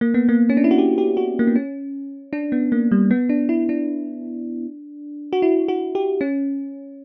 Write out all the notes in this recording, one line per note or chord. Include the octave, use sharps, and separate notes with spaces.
A#3
B3
A#3
C#4
D4
E4
F#4
G4
G4
F#4
A#3
B3
C#4
D4
B3
A#3
G3
B3
D4
E4
D4
F#4
E4
F#4
G4
C#4